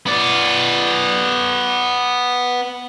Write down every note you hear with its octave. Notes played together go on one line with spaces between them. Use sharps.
B3 D5